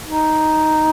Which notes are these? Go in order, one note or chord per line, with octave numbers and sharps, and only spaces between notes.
D#4